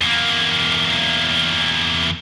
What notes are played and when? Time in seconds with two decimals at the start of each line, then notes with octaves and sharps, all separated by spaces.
0.01 E2 A#3